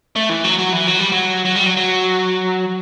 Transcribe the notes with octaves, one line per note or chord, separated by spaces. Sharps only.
A3
E3
F#3
F#3
E3
F#3
G3
F#3
F#3
G3
F#3
F#3